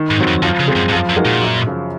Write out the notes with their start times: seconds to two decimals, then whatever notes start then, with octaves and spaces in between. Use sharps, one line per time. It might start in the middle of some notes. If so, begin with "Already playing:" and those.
Already playing: D#3
0.11 G#2
0.18 F#3 C4
0.27 F2
0.42 F#2 F3
0.59 C#3
0.68 G#3 C4
0.76 F#2
0.89 G#2
0.92 F#2 F3
1.09 F#2
1.16 G#3 D#4 F#4 A#4
1.25 A#2
1.42 F#2
1.66 C#3 F3